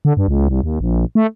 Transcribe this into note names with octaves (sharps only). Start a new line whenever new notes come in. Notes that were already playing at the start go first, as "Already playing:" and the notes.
D3
G2
C#2
C2
D#2
A#1
A3